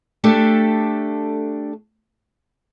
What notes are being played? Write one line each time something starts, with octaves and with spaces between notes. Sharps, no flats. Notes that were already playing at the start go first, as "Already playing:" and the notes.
A3 D4 G4 A4